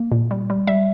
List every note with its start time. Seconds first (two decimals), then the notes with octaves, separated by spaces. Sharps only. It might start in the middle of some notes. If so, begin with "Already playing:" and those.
Already playing: A#3
0.12 A#2
0.31 G3
0.50 G3
0.67 G3 E5